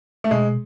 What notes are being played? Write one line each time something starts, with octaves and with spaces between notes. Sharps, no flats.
A3
B2 G#3